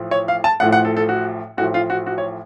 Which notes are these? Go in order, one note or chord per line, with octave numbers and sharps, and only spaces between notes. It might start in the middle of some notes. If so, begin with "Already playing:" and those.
Already playing: A1 A2 F3
C#5
F5
A5
A1 A2 F3 F#5
F#5
A4
A4
F#4
A1 A2 F3 F#4
F4
F#4
F#4
C#5